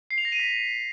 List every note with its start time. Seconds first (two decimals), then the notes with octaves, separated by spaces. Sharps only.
0.11 C7
0.18 F7
0.25 A#6
0.32 D#7
0.39 B6